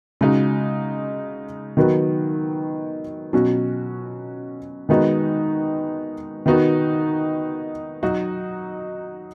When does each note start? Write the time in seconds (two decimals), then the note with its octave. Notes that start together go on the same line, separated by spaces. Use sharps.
0.21 C#3 G#3 D#4 F#4
1.77 D#3 F#3 B3 F#4
3.33 B2 F#3 C#4 F#4
4.89 D#3 G#3 B3 D#4 F#4
6.46 D#3 B3 D#4 F#4
8.03 F#3 D#4 F#4